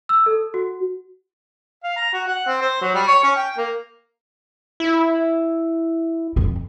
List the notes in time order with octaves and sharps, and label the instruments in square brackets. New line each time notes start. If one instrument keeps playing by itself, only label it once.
[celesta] E6
A4
F#4
[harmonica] F5
A#5
F#4
F#5
C4
C5
F#3
G3
C#5
C#4
G5
A#3
[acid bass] E4
[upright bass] F2 C4